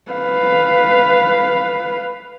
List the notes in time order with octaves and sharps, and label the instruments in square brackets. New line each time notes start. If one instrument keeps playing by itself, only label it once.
[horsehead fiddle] B4 F5